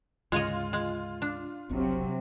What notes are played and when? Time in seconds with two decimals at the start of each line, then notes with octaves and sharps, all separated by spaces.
0.32 D2 G#2 C#3 G#3 F4 C#5 D#5
0.73 G#3
1.22 D4
1.70 F#1 C2 C3 F#3